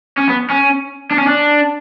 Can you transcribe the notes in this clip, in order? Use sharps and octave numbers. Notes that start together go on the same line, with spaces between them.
C#4
B3
C#4
D4
C#4
D4